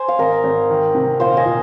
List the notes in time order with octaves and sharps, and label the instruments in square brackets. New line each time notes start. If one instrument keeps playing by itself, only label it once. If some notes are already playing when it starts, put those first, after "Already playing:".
Already playing: [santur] C5 G#5
F5
[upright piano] G#1 [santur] A#4 D#5
[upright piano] G#1
D#3
C3
[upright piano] A#2 [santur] C5 F5
[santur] D#5 G#5
[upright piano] A#2